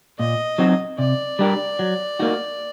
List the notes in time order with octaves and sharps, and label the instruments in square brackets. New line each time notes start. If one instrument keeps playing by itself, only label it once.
[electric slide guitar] A#2 [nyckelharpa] D#5
[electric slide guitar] F#3 C4 D#4 F#4
[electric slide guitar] C3 [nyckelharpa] D5
[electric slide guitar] G3 D4 G4 A#4
F#3
A#3 D#4 F#4